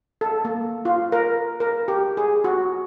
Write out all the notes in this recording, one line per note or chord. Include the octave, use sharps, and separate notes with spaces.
A4
A#3
F4
A#4
A#4
G4
G#4
F#4